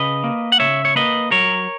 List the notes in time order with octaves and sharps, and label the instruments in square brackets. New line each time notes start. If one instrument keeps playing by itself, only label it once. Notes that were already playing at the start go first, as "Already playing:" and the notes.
Already playing: [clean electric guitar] C#3 B4 D#5
A#3
F#5
C#3 C#5 E5
C#5
A#3 B4 D#5
F#3 A#4 C#5